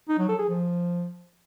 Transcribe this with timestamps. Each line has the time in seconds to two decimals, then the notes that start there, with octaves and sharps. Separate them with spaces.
0.09 D#4
0.19 F#3
0.29 A4
0.39 G#4
0.49 F3